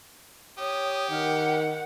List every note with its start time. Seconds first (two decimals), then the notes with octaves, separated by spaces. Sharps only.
0.59 G4 C#5 D#6
1.11 D#3 A#4 F#5